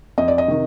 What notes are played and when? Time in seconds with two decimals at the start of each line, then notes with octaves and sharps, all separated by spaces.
0.18 F2 D#5
0.28 D5
0.38 D#5
0.48 C3 D#3